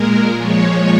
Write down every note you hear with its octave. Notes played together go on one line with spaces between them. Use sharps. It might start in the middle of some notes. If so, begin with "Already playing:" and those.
Already playing: A#2 G#3 A#4
A#2 F3 G#3 C#5